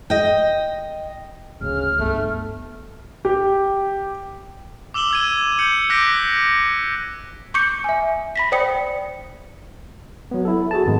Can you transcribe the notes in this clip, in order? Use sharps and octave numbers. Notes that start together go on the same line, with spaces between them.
D#5 G5
D2 C#3 F6
G1 A3
G4
D6 E6 E7 F#7 G7
E6 G#6 D#7
G#6 E7
G6 C#7 F#7
D6 F#6 G6 A#6 B6 D7
C#6 D6 G6 C#7
E5 G#5
B5 A#6 B6
C5 D5 G5 D#6 C#7
F#3 B3
E4 A4
F#4 G#4 A5
F2 G#2 D#3 G#3 A3